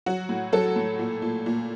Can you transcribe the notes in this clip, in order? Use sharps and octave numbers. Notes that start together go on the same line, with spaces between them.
F#3 F#4
A2
F#3 A4
A2
A#2
A#2
A#2